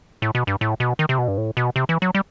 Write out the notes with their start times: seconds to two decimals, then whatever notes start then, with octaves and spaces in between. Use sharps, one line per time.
0.22 A2
0.35 B2
0.47 G2
0.61 A2
0.80 B2
0.99 D#3
1.09 C3
1.18 B2
1.28 G2
1.38 A2
1.57 B2
1.76 C3
1.89 E3
2.02 F#3
2.15 G3